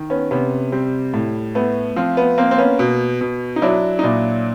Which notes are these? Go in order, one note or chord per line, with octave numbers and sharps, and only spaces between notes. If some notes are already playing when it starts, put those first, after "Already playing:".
Already playing: D#3
B3 C#4
C3 B3 C#4
G3 C4
A2
A3 B3
F3 C4
B3
A#3 C4
C4
B3 C#4
B2
B2
D#4
F#3 D4 E4
D#4
A#2 D4 E4